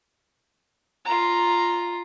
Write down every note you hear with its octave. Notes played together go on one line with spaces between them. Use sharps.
F4 A#5